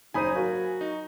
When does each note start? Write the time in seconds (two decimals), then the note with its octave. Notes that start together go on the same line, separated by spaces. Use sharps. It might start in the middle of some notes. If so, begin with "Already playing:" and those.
0.14 F#1 D#4 C5 G#5 B5 D#6 D#7
0.35 F#3 F#4 A#4 F5
0.81 D#4